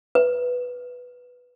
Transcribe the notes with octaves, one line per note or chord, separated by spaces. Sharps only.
B4